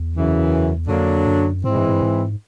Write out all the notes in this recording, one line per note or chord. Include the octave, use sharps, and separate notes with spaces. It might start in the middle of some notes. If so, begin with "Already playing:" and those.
Already playing: E2
F#2 C#3 E3
F2 D3 F#3 A#3 D4
F#2
G#2 E3 G#3 C4 E4
G2
G2
G#2